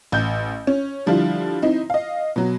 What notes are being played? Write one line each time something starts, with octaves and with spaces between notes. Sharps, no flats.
A1 G6
C#4
D3 F3 G3 E4 F4
C4 D#4 E4
D#5 F5
B2 F#3